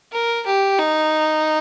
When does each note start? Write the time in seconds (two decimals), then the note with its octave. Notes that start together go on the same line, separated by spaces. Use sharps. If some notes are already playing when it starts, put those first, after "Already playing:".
0.12 A#4
0.46 G4
0.79 D#4